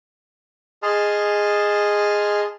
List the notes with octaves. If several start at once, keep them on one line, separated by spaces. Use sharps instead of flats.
G#4 D#5 A5 C6 F6